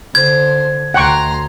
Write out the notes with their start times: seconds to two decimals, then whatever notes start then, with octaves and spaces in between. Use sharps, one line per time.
0.15 D3 C5 G#6
0.94 D2 F#5 G5 A#5 C6 C#6